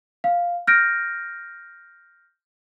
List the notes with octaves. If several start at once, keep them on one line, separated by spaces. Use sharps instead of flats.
F5
F6 G6 A#6 D7